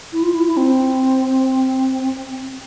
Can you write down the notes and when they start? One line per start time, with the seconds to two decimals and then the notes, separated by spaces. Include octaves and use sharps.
0.13 E4
0.23 F4
0.34 E4
0.46 E4
0.57 C4